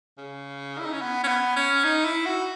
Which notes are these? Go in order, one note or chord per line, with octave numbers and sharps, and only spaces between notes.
C#3
E4
D#4
C#4
B3
C#4
B3
C#4
D#4
E4
F#4